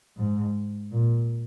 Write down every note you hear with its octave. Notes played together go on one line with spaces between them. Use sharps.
G#2
A#2